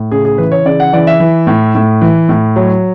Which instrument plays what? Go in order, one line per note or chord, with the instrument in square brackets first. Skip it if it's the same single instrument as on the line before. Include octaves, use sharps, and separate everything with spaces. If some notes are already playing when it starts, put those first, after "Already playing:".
Already playing: [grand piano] A2
C#3 G#4
G#4
E3 B4
C#5
C#3 D5
F#5
E3 D5
E5
E3
A2
A2
E3
A2
F#3